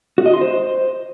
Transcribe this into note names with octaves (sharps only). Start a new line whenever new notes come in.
F#4
D#5
C6
C5